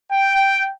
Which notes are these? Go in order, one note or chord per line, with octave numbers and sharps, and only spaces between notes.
G5